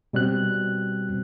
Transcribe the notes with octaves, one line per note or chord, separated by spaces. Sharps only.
B2 G3 C4 F#6